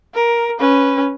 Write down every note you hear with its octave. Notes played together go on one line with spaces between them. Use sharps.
A#4
C#4 B4